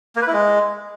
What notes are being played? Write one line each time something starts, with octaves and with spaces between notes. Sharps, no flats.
A#3
B4
E4
G#3